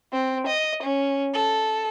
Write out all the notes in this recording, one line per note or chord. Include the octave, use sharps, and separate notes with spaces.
C4
D#5
C#4
A4